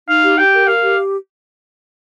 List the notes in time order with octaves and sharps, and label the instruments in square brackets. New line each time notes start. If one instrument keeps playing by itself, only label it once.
[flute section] D#4 [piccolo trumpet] F5
[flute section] G4
[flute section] G4 [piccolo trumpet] G5
[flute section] A#4
[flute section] A#4 [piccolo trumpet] F5
[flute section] G4